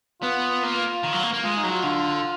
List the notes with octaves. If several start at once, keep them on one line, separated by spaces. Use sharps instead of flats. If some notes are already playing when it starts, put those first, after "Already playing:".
B3 F4
A#3
D#3
F#3
A#3
A#3
G#3 F4
D#4
F#3
F4
D3